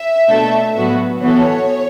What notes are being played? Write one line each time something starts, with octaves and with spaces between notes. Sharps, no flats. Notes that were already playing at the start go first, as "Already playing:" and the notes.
Already playing: E5
B2 A3 D4 A4
A2 F#3 B3 F#4 B4
E3 B3 F#4 A4 C#5